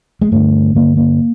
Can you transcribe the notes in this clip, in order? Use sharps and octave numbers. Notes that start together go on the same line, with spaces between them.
G#3
G2 D3 A3
G2 D3 A#3
A#3